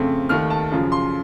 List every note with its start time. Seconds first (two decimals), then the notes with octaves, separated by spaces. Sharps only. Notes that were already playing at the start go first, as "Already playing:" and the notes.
Already playing: F2 C#3 A3 C4
0.29 D#2 D#3 A3 F6
0.50 A5
0.71 F#2 C#3 F3
0.92 C6